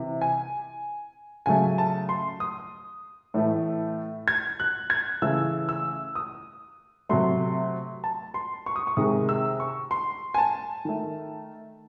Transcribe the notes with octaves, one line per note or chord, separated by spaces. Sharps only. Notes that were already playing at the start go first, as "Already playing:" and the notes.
Already playing: C3 E3
G#5
C#3 F#3 A3 G#5
A5
C6
D#6
A2 E3 A3
G#6
F#6
G#6
C#3 E3 A3 E6
E6
D#6
C3 F#3 A3 C6
A5
C6
C#6
D#6
C#6
C3 D#3 G#3 D#6
E6
C#6
C6
G#5
A5
D#3 A3